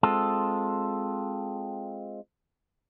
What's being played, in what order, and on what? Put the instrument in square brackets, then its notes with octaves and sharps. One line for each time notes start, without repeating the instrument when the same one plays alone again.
[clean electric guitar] G#3 C4 F4 A4